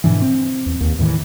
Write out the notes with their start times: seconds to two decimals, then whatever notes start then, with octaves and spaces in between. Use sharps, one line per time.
0.04 G#2 B2 D3 E3
0.22 C4
0.66 E2
0.81 D#2
0.99 E2 A2 D#3 E3